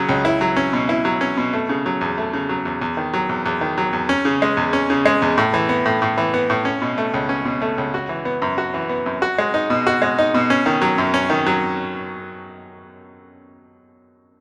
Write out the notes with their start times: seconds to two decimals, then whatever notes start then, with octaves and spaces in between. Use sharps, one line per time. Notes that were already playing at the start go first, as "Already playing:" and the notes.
Already playing: C#3 F#3 C#4
0.09 C#2
0.25 E4
0.41 F#3
0.56 C#4
0.73 B2
0.89 E4
1.05 F#3
1.21 C#4
1.38 B2
1.53 A3
1.69 C#3
1.86 F#3
2.01 E2
2.18 A3
2.33 C#3
2.49 F#3
2.65 E2
2.82 E2
2.97 D#3
3.14 F#3
3.29 E2
3.46 E2
3.61 D#3
3.78 F#3
3.93 E2
4.09 C#4
4.25 C#3
4.42 G#3
4.57 E2
4.73 C#4
4.90 C#3
5.06 G#3
5.22 E2
5.38 A2
5.54 E3
5.69 B3
5.86 A2
6.02 A2
6.18 E3
6.34 B3
6.50 A2
6.65 C#4
6.82 B2
6.98 A3
7.14 C#2
7.29 C#4
7.45 B2
7.62 A3
7.78 C#2
7.94 F#4
8.09 E3
8.25 B3
8.42 F#2
8.58 F#4
8.74 E3
8.89 B3
9.06 F#2
9.22 F#4
9.38 G#3
9.54 D#4
9.70 B2
9.87 F#4
10.02 G#3
10.19 D#4
10.34 B2
10.50 C#4
10.66 D#3
10.82 F#3
10.98 F#2
11.14 C#4
11.30 D#3
11.46 F#3